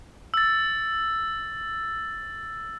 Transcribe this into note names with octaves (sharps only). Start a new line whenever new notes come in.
E6 A6